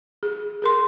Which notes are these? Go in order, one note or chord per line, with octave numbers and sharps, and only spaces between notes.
G#4
G#4 A#4 C6